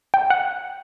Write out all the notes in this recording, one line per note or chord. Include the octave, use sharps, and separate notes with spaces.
G5
F#5